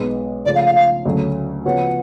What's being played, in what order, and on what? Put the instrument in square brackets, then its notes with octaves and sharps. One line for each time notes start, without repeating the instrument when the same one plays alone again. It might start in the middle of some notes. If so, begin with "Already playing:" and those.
Already playing: [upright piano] B1 B2 G#3 B3
[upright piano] C#3 F3 A3 [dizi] D5
[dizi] F5
F5
F5
[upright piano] D2 C#3 F#3 A3 C#4
[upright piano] C#3 F3 B3 F#4 C#5 [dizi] F#5